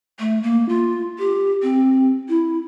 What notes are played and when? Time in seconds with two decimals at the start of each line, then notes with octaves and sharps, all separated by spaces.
0.20 A3
0.43 A#3
0.69 F4
1.19 G4
1.63 C4
2.29 E4